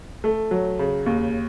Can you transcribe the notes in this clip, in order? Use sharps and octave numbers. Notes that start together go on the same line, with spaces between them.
A3
F#3
C#3
D#2